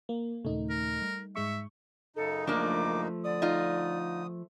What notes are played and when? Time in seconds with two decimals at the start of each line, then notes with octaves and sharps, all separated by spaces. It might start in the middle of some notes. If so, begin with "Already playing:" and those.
0.09 A#3
0.45 D#2 A#2 C#3 A3 D#4
0.70 A#4
1.02 G3
1.35 G#2 G#3 E5 C#6
2.16 F#2 C#3 D#4 A4
2.47 F3 A3 A#3 D4 D6
3.24 D3 D5 D#6
3.42 D#4 F4